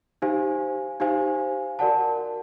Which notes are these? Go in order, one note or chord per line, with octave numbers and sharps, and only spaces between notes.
D#4 G4 C5 F5 G#5
D#4 G4 C5 F5 G#5
F#4 A#4 D5 F#5 A5